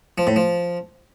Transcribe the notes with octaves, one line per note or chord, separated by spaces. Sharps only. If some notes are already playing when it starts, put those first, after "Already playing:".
F3
A2
F3